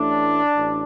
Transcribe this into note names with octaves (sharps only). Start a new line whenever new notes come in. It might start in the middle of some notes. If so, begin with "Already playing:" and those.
Already playing: A1 A2 A3 D4
A1